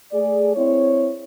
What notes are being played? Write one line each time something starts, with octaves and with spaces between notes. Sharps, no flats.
A3 G#4 D5
C4 E4 C#5